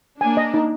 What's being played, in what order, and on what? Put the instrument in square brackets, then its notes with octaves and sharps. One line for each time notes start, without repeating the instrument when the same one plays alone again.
[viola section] A#3 D4 [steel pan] G#5
[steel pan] D#5
D#4